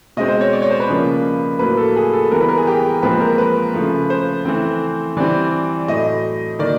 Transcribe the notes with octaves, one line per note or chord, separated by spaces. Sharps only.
B2 G#3 C4 D#5
C5
C#5
D5
C#5
C5
B4
C#3 F3 A#3
A2 F#3 A#3 B4
A4
G#4
A4
E3 G3 B3 A#4
B4
A#4
G#4
G4
A#2 F3 G#3 C4 B4
A#4
B4
C#3 F3 A3
C5
E3 A3 C4
E3 G3 C4 D5
A2 F#3 A3 D#5
D#3 F#3 A#3 D5